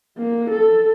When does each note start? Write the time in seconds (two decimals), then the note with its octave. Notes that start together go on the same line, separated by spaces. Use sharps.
0.18 A#3
0.50 A4